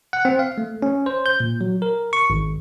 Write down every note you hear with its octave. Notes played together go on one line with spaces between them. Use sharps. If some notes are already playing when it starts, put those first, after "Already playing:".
F#5
C4
F5
A3
C#4
C5
G6
A#2
F#3
A#4
C#6
G#1